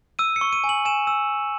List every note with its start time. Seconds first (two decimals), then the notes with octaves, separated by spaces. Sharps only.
0.19 E6 D#7
0.36 C#7
0.41 C#6
0.53 D#7
0.64 G#5
0.69 F#7
0.85 G#5 E7
1.07 E6